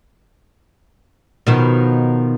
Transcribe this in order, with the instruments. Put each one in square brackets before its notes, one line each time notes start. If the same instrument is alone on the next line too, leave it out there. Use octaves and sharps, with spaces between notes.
[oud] B2 D#3 F3